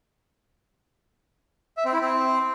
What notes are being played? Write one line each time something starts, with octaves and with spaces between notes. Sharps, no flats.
E5
C4
E4
C4